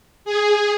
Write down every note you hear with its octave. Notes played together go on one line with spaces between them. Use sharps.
G#4